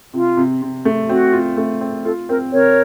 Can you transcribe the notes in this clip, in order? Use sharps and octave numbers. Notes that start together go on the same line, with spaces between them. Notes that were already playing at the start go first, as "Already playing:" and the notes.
C3 F4
C3
C3
A3
C4 F#4
F4
A3
C4
F4 A4
C4 A#4
C3 A#4 C#5